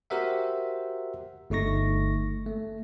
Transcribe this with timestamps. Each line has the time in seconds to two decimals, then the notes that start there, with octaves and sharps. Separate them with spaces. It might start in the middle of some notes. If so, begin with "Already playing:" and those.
0.10 F#4 G4 A#4 C5 E5 F#5
1.50 G1 A3 D#4 C#6 A#6
2.46 A3